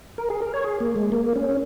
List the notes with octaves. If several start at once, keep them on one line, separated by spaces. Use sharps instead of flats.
A#4
G#4
A#4
C#5
G#4
A#3
G#3
A#3
C#4